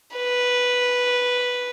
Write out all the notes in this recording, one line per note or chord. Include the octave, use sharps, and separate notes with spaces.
B4